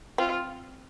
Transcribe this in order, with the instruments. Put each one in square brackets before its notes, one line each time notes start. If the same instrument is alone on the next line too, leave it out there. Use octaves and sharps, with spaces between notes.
[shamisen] C4 [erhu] F4